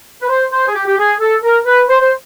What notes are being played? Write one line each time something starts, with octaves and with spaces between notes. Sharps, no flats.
B4
C5
C5
G#4
G4
G4
G#4
A4
A#4
B4
C5
C5